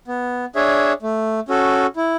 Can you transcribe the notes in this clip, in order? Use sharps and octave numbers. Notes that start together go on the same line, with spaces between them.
B3
D4 G#4 C#5 E5
A3
C#4 F#4 A4
E4